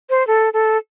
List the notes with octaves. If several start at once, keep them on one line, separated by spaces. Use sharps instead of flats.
C5
A4
A4